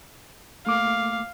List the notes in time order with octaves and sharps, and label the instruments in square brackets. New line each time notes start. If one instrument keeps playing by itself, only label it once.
[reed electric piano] A3 A#3 D6 [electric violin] F5